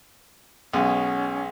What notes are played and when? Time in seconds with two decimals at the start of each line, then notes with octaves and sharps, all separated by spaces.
0.73 B1 G#3 B3 C#4